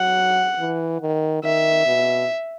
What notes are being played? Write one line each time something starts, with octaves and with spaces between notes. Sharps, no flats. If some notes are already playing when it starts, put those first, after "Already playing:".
Already playing: F#3 F#5
E3
D#3
D#3 E5
B2